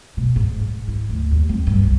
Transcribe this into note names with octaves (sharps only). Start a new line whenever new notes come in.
B2
G#2
G#2
E4
D2
D#2
C4
G2
C2